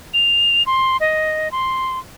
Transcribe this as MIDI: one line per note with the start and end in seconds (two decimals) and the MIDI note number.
0.14 0.63 101
0.66 0.97 84
1.00 1.51 75
1.52 1.99 84